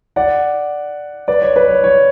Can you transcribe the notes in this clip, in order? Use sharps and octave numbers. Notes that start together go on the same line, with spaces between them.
D5 F#5
B4 D5
C#5
B4
C#5
C#5